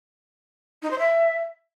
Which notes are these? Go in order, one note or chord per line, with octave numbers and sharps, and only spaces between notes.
D#4
C5
E5